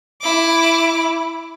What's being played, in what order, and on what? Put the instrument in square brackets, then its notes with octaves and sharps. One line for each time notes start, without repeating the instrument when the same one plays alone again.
[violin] E4 D6